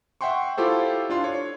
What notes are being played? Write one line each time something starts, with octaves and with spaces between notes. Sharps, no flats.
E5 F#5 G5 C6 C#6
E4 F4 G4 A4 C5
D4 F4 C6
C#5